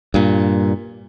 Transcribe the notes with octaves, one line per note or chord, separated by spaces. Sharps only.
G2 A#2